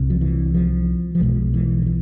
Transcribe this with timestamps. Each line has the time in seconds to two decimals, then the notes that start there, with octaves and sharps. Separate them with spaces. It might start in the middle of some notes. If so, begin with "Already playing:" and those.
Already playing: C2 C3
0.10 F3
0.21 E3
0.54 F3
1.15 F3
1.20 B1 B2 G#3
1.54 E3
1.82 D3
1.86 E3